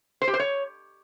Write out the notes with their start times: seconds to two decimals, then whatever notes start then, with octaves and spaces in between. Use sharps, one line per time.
0.22 C5
0.28 G4
0.34 C5
0.40 C#5